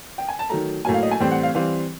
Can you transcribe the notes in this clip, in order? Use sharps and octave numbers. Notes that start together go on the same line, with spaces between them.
G5
G#5
A5
D#3 F#3 A3 A#5
A2 F#3 A#3 G#5
F5
D#5
G#5
A2 E3 G3 C4 G5
F#5
F5
E3 G3 C4 F5